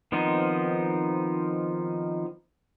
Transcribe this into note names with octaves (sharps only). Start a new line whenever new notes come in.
D#3 F3 B3 C4 D#4